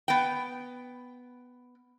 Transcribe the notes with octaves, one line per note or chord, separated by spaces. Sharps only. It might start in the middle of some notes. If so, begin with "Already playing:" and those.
B3 G5